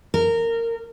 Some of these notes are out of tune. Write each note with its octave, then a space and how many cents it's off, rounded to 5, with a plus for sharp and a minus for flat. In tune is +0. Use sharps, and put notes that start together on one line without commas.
A#4 -20